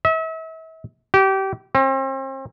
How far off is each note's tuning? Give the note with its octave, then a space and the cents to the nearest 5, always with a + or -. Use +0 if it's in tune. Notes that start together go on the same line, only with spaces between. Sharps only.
E5 -40
G4 -25
C4 +40